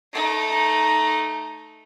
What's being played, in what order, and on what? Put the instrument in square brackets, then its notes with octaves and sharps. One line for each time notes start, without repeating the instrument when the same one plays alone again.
[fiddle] A3 D#4